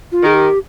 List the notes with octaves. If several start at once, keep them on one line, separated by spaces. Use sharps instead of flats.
F4
D#3 G#4
G4